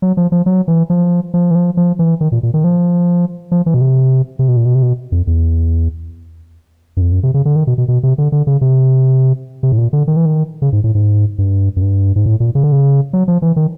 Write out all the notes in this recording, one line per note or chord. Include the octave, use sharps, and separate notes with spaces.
F#3
F3
F3
F#3
E3
F3
F3
E3
F3
F3
E3
D#3
A#2
A#2
D#3
F3
F3
E3
B2
C3
C3
B2
A#2
B2
C3
B2
F2
E2
F#2
F2
F#2
C3
C#3
D3
D#3
B2
B2
B2
C3
D3
D3
C#3
C3
C3
A2
A#2
D3
D#3
E3
D#3
C#3
G#2
A2
G#2
G2
F#2
G2
G#2
A2
A#2
C#3
D3
C#3
F#3
F3
E3
D#3